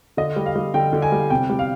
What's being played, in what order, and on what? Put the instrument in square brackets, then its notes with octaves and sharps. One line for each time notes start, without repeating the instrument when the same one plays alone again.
[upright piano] D3 D#5
G3
F5
G3
D3 G5
D3
G#5
G3
C3 G5
G3
F5